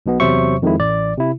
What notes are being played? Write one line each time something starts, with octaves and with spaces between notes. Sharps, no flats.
B1 B2 B3
E2 C3 F#3 C5 E5 C#6
F2 D#3 F3 G#3 E4
A1 D5
C3 E4